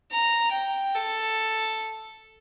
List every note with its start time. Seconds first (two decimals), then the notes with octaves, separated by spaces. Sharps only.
0.11 A#5
0.52 G5
0.95 A4